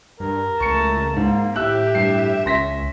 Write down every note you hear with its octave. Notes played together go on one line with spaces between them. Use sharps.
G2 A#4
C#2 A3 A5 C#6 C#7
G#2 A#3
A2 G4 E5 E6 F#6
G2 C7
C#2 C#4 E5 C6 A#6 B6